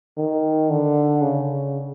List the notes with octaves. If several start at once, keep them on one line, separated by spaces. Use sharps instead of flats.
D#3
D3
C#3